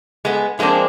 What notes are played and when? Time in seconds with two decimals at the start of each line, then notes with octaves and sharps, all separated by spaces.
0.25 G#3 B3
0.59 F3 G#3 A#3 C4 D4